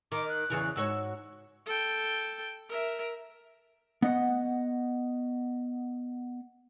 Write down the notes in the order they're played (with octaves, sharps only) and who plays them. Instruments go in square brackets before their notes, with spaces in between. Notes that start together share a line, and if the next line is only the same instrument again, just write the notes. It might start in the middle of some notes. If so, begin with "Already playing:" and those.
[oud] D#3 [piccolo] D6
[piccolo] F#6
[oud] E2 C#3 E3
[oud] G#2 F#4 C#5 [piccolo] E6
[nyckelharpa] A4 G5
A#4 E5
[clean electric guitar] B3 D#5 F#5